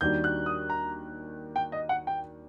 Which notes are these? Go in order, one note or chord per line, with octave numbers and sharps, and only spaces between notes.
D#2 D#3 G3 D4 F#4 G6
F#6
D#6
A#5
G5
D#5
F#5
G5